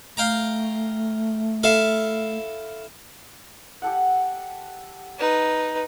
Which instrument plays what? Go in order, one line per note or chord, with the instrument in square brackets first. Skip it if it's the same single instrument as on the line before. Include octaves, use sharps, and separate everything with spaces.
[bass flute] A3 [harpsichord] F5 G5 A#5
[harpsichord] E4 A4 F5
[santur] G4 A4 F#5
[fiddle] D#4 B4